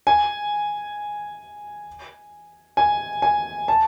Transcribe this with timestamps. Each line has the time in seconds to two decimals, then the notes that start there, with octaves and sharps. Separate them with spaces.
0.07 G#5
2.77 G#5
3.22 G#5
3.68 A5